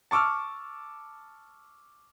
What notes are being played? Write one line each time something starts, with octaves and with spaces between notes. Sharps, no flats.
A5 C#6 D6 E6 F6